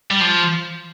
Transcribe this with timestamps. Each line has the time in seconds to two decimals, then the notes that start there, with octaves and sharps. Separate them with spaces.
0.11 G3
0.21 F3